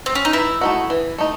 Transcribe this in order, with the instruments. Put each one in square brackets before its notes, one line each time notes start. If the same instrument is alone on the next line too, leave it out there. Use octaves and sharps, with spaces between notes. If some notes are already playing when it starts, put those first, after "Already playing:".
[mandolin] C4
C#4
D#4
[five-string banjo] E3 [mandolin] E4
[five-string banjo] A3 D#4 F#4
E3
A3 D#4